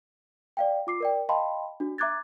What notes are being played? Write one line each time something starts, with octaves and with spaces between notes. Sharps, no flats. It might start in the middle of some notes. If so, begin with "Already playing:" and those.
D5 F5 G5
F4 D6 C7
A#4 D5 G5
D#5 F5 G5 A5 B5 C6
D4 F#4
E5 A#5 D6 F#6 G#6 A6